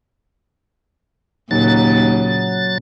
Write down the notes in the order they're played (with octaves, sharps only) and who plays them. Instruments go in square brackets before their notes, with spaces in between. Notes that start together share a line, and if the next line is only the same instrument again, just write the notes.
[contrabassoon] D#2 [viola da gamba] A#2 C#3 [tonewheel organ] F#3 A6